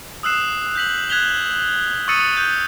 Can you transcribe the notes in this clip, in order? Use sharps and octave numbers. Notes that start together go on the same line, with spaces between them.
D#6 E6 F#6 C7 E7
G6 B6 F#7
F#6 G#6 B6 F7 G7
C#6 D#6 E6 A6 C#7 D#7
G6